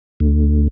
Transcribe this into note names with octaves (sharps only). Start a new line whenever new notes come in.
D2